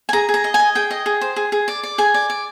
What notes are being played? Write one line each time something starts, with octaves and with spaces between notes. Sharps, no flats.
G#5
G#4 A#5
G#4
A#5
D#5
G#5
D#5
G#4 G5
D#5
G#4
C5
G#4
G#4
D5
D5
G#4 G#5
D5
D5